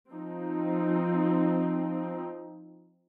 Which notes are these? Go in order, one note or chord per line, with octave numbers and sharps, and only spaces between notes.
F3 C4 D#4